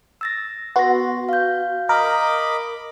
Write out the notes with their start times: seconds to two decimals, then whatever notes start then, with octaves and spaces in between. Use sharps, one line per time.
0.21 E6 A6 A#6
0.76 B3 F#4 C6 A#6
1.29 F5 G6
1.89 A#4 D#5 B5 D6